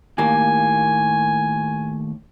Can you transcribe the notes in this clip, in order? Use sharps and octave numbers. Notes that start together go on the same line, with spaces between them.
D#2 A2 A#3 G#5